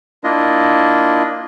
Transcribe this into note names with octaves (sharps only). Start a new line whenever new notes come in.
A#3 D4 E4 F4 D#5